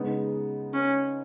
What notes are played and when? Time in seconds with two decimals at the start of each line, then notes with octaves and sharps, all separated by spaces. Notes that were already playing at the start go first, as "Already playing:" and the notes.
Already playing: C#3 G#3 B3 D#4
0.74 C#4